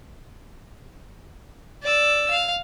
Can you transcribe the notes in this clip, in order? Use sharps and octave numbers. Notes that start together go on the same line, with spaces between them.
D5 E6
F5